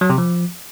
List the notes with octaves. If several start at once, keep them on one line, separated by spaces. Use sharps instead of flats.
F#3
C3
F3